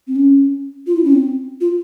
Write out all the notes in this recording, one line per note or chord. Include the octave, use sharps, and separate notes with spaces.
C4
C#4
F4
E4
C#4
C4
F4